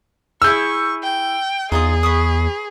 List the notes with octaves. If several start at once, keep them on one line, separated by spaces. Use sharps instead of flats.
E4 G#4 C#5 C#6 E6 G6
G5
E2 D#4 F4 G#4 D#6
B4 C#6 D#6